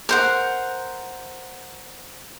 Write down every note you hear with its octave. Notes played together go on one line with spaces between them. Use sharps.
A#4 C5 F#5